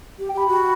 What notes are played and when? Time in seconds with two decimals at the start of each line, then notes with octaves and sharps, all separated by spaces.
0.19 G4
0.29 G5
0.33 G4 B5
0.48 F#4